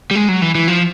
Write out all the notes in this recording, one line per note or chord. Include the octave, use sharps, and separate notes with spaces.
G3
G#3
F#3
E3
E3
F3